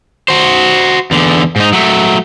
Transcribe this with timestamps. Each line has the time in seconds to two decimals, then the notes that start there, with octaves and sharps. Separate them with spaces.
0.28 F#4 C5
1.11 E2 D3
1.56 G#2 D#4
1.73 F#3 A3